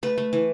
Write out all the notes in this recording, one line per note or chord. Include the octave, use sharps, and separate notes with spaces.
A3 B4
A3
E3